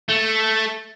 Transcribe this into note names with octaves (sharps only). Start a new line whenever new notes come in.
A3